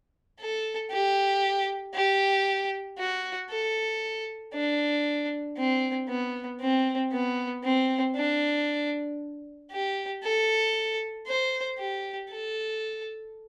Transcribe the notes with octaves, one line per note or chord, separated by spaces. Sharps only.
A4
G4
G4
F#4
A4
D4
C4
B3
C4
B3
C4
D4
G4
A4
C5
G4
A4